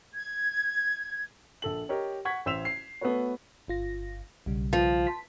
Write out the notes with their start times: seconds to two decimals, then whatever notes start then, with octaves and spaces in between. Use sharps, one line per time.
0.13 G#6
1.62 A#1 A4 F#7
1.89 G4 A#4 C#5 D#5
2.25 F#5 C#6 G#6 B6
2.46 A1 C5 E6 B6 E7 F7
2.65 C7
3.01 A3 B3 F#4 A4 B4 C#5
3.68 G1 F4 A#6
4.46 B1 C#3 G3
4.73 F3
5.07 A5 C6 B6